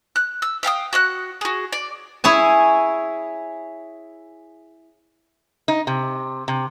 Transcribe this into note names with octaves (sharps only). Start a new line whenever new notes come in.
F#6
E6
E5 F5 G5 D#6
F#4 F#5 F#6
F#4 G#4
D5
E4 G#4 C#5 G#5
D#4
C3
C3